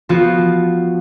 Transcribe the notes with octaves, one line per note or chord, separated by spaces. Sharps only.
F3 B3 F4 F#4